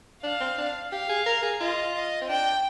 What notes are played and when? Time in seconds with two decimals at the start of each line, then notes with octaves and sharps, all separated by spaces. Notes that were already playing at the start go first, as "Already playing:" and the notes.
0.23 D4 F5
0.40 C4
0.58 D4
0.92 G4 F5
1.09 G#4
1.26 A#4
1.43 G#4
1.60 F4 D#5
1.95 D#5
2.21 C4
2.29 D4 G5